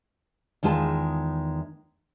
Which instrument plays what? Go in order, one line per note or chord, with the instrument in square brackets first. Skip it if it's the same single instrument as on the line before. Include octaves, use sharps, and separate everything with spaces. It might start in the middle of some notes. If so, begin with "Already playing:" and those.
[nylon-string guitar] E2 D#3 G#3 F4 A5